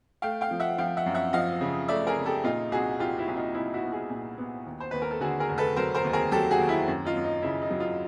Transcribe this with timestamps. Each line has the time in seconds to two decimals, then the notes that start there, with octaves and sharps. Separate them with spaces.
0.22 A3 F5 G5
0.41 F5 G5
0.51 F3
0.60 E5 F#5
0.78 F3 F5 G5
0.97 E5 F#5
1.06 F#2
1.14 E5 F#5
1.33 F3 D#5 F5
1.61 C#3
1.88 A3 D5 E5
2.07 G#4 A#4
2.16 C#3
2.26 G4 A4
2.44 A#2 D#4 F4
2.72 C2 F#4 G#4
2.99 C2 F4 G4
3.18 E4 F#4
3.28 C2
3.37 D#4 F4
3.54 C2 E4
3.74 E4 F#4
3.83 B3
3.92 F#4 G#4
4.10 A#2
4.38 B3
4.66 D#2
4.80 C5
4.91 D#2 B4
5.02 A#4
5.11 A4
5.21 D3 F#4 G#4
5.40 G#4 A#4
5.49 F1
5.58 A4 B4
5.77 F#3 A#4 C5
5.95 A#4 C5
6.04 D#2
6.13 G#4 A#4
6.31 F#3 G4 A4
6.51 F#4 G#4
6.59 D#2
6.69 E4
6.88 F#2
7.05 D#4 F4
7.16 F#2
7.24 D#4
7.42 C#3 E4
7.62 D#4
7.71 F#3
7.80 D#4 F4